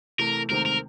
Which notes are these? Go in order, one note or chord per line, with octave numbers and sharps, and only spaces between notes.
C3 E3 A3 A#4
D2 C3 D#3 G#3 C4 A#4
A#4